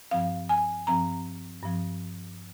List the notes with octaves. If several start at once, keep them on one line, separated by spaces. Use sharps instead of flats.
G2 F3 C4 F5
G#5
G2 F3 C4 A#5
G2 F3 C4